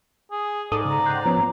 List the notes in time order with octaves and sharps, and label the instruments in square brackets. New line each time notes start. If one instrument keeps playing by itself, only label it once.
[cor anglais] G#4
[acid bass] G#2 [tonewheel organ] A4 D#6 [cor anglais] D5
[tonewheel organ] C#3 [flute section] A#5
[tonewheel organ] F#5 G5 C6
F3 B3 C#4